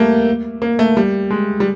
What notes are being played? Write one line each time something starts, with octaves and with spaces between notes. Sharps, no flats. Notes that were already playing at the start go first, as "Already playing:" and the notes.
Already playing: G3 A3 A#3
A#3
A3
G3
G#3
G3